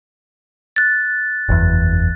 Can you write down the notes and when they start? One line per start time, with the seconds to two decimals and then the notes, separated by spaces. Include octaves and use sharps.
0.76 F#6 A6
1.49 F#1 E2